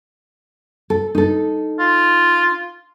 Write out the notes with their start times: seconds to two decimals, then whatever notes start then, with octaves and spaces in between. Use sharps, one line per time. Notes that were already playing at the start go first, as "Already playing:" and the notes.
0.90 A4
1.15 D#4 A4
1.79 F4